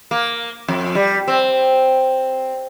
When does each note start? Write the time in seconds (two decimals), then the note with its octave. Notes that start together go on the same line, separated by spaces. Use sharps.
0.11 A#3
0.68 F2
0.95 G3
1.28 C4